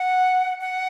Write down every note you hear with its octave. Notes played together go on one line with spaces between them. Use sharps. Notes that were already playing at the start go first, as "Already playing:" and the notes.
Already playing: F#5
F#5